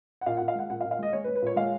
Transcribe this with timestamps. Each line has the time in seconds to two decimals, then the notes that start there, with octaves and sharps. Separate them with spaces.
0.21 F#5
0.26 A#2 F5
0.37 F#5
0.42 A#2
0.48 F5
0.55 G#3 F#5
0.70 A#2 F#5
0.81 F5
0.85 A#2
0.91 F5
0.99 G#3 D#5
1.13 G#3 C#5
1.24 B4
1.28 G#3
1.36 B4
1.42 A#2 C#5
1.56 G#3 F5